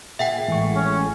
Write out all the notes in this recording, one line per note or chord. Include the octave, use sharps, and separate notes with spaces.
A#2 G#4 E5 F#5 G5
A1 E3 G#3 A3 C#6
C#4